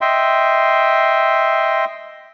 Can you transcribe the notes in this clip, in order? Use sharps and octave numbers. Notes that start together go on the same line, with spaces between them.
D#5 E5 G5 C6